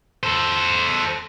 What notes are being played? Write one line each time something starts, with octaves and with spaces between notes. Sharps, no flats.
A4 C5